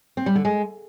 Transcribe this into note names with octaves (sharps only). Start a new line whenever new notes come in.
C4
G3
D3
G#3